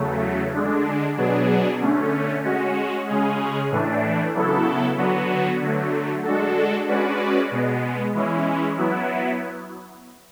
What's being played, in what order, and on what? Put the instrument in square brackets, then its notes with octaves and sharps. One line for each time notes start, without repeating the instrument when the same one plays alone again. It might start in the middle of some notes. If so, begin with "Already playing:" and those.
Already playing: [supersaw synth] E2 C#3 F#3 A3
D3 G#3 D4
B2 F#3 B3 D4 G#4
D3 A3 C#4
G#3 C#4 F#4
C#3 G#3 C#4 G#4
A2 E3 A3 D4
C#3 F#3 B3 E4 A4
D3 F#3 B3 F#4
D3 F#3 A3
G#3 D4 F#4 A4
G#3 C#4 F#4 B4 D5
B2 G#3 B3
E3 G#3 C#4 E4
F#3 B3 E4